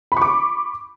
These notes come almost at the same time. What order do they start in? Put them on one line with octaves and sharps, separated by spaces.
B5 C#6 D6